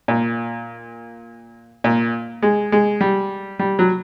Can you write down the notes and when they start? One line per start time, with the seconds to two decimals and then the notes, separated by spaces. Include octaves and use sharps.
0.08 A#2
1.84 A#2
2.42 G#3
2.72 G#3
3.01 G3
3.59 G3
3.79 F#3